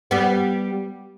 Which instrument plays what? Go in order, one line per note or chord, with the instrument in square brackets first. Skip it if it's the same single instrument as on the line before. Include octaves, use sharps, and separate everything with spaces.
[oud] G3 B3